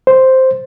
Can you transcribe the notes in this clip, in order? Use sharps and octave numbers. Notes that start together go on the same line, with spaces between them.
C5